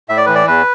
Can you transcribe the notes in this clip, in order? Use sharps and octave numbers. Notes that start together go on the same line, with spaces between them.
A2 E5
D5
E3 B4
D5
E2 B4